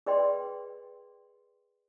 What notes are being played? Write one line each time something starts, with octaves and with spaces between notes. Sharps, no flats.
G#4 B4 D5 D#5 G5 C6